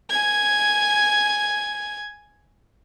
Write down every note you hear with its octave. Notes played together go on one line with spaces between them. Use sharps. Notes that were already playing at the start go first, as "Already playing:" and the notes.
G#5 G#6